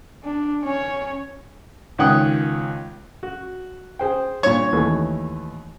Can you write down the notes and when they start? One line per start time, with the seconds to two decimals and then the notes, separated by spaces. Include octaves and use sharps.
0.24 D4
0.63 C#4 C#5
1.98 C#2 D#3 C#4 F#5 G5 D#6
3.23 F#4
3.99 G#4 C5 G5
4.43 G2 A#2 C#5
4.73 D#2 E3 A3